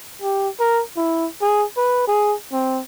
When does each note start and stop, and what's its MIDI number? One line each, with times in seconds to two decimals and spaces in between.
0.22 0.48 67
0.60 0.83 70
0.97 1.27 64
1.42 1.64 68
1.77 2.06 71
2.07 2.35 68
2.53 2.81 60